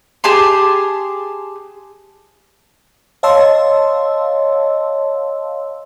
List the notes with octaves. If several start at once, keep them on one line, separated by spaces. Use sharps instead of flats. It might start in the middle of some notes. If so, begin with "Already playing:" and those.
G4 G#4 A5 C6
C#5 D#5 F5 A5 C6 E6